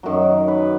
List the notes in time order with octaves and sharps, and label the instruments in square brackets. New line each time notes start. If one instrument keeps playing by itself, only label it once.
[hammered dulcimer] F#2 D#3 F#3
B4